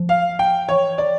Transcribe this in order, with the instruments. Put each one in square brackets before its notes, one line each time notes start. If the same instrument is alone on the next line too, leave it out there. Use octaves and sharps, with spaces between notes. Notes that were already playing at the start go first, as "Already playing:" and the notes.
Already playing: [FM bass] F3
[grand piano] F5
G5
[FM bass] E3 [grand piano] C#5
[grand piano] D5